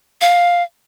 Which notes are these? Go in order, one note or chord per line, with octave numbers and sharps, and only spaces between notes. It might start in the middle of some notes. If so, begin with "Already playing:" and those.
F5